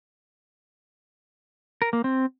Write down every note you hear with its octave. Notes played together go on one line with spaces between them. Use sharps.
A#4
A#3
C4